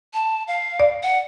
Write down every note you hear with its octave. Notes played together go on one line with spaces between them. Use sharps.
A5
F5
D5
F#5